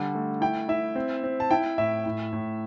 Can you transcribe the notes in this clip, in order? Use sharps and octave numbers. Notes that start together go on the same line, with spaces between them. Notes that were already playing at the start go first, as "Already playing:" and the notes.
Already playing: D3 G3
A3
E4 G5
E4 E5
C4
C4
A5
E4 G5
A2 E5
A2
A2